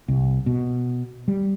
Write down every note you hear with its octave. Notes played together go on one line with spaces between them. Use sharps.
C2
B2
G3